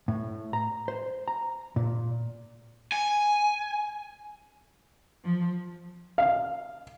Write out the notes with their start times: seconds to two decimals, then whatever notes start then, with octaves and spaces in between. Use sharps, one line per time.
0.08 A2
0.53 A#5
0.88 C5
1.28 A#5
1.76 A#2
2.92 G#5
5.26 F3
6.18 F5